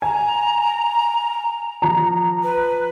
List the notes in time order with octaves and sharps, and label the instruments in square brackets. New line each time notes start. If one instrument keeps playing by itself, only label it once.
[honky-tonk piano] G#5 [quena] A#5
[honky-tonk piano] F3 A#5
[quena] B4